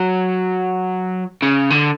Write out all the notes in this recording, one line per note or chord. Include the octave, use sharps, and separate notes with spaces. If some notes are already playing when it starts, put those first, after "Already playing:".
Already playing: F#3
C#3
D3